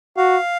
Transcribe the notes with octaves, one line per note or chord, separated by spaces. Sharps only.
F#4 F5